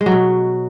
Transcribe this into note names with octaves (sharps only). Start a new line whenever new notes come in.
G#3
F#3
B2